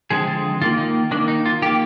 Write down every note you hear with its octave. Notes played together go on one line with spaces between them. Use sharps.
D3 F3 G#3 C4 G#4
F4
D#3 A#3 F4
D#4
D#3 A#3 D4
D#4
F4
D#3 A#3 G4